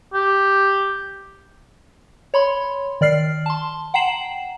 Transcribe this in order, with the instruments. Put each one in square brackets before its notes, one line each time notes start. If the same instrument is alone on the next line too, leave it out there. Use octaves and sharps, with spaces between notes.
[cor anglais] G4
[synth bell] C#5 B5 C6
D#3 D5 F6 C7
A5 C6
F#5 G5 A#5 C7 E7 F#7